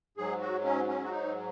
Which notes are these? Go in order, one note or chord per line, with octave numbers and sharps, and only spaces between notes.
G#2 F#3 G#4
F#4
C#4
C#4
F#4
D#4